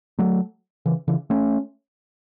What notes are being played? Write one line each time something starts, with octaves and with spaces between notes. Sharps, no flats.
F#3 A3
C#3 E3
C#3 E3
A3 C#4